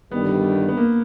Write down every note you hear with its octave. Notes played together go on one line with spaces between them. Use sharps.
G1 G2 D#3 G3 B3
B3
A#3